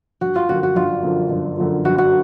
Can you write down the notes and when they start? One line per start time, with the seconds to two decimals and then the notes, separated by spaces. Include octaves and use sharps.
0.21 G1 F#4
0.36 F4
0.49 F#2 D3 F3 F#4
0.63 F#4
0.76 G1 F4
1.03 F#2 D3 F3
1.30 G1
1.57 F#2 D3 F3
1.85 G1 F#4
1.98 F#4